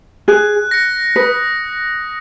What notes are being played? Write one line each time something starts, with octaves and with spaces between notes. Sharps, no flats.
G#4 F#6
A#6 C#7
B4 D#6